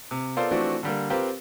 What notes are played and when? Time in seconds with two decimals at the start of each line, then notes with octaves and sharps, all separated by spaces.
0.11 C3
0.37 B3 F4 A4 A#4 C5 D5
0.51 E3 F3 A3 C4 D4 F#4
0.83 D3 G3 A#3
1.10 C4 F4 G4 A#4 B4